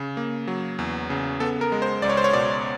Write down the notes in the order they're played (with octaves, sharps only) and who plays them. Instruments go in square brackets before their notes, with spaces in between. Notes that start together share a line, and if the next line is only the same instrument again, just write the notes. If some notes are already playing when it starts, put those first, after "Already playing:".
Already playing: [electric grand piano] C#3
A#3
F#3
E2
C#3
B3 A4
A#4
G#3
C5
C#2 D5
C#5
C5
C#5
B2 D5